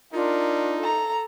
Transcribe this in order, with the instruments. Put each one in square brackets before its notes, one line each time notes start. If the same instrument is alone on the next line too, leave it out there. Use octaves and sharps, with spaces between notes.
[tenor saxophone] D4 [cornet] D#4 [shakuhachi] F4 [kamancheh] A#4
[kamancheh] A4 A#5